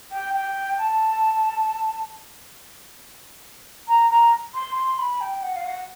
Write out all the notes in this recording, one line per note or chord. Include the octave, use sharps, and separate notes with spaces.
G5
G5
A5
A#5
A#5
C6
C6
B5
G5
F#5
F5
F#5